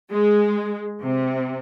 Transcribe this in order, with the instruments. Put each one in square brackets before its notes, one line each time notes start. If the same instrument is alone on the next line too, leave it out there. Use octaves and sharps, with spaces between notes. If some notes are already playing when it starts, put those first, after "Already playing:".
[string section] G#3
C3